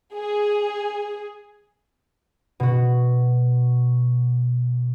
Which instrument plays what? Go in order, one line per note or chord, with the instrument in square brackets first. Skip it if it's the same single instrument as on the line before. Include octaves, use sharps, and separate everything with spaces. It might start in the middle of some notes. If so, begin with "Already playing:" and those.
[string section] G#4
[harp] B2 F#4